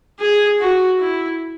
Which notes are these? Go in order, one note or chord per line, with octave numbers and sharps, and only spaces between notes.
G#4
F#4
E4